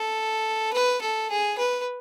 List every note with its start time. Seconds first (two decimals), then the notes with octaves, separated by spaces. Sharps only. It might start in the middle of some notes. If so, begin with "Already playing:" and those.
Already playing: A4
0.73 B4
1.01 A4
1.30 G#4
1.58 B4